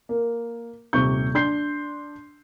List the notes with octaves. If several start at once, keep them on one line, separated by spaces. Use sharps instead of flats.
A#3
D#1 C3 C#6 G6
D4 C6 G6 C7